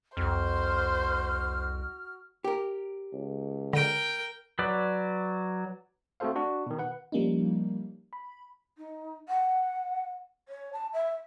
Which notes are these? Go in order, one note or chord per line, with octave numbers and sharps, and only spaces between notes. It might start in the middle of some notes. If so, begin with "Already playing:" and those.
C2 F2 F#4 C5 F6
G4 A#4
C#2
D3 A#4 G5 D7
F#3 B4 D5
A3 C4 F#4 A4 C5 F5
D4 F#4
B2 D#3
B4 F#5
F3 G3 A#3 C#4 D#4
B5
D#4
F#5
C#5
A5
E5